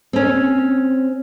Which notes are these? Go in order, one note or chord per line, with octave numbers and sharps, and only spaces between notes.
C4 C#4